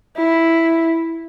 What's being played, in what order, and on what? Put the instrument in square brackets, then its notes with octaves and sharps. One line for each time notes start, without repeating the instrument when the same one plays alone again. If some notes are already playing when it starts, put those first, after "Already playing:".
[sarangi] E4